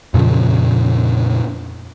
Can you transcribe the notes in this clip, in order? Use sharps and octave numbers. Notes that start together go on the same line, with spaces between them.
F2 A#2 C#3 F3